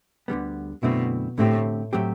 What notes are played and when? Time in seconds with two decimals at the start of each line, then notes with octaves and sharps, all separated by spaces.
0.28 D2 D3 G3 B3
0.83 F#2 B2 D3 A3 C4 E4
1.38 A2 D3 A3 C4 G4
1.93 A2 F#3 A3 C4 G4